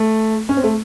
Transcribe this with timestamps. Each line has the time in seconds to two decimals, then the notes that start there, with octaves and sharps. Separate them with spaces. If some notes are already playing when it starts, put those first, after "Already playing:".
Already playing: A3
0.49 C#4
0.57 C4
0.64 A3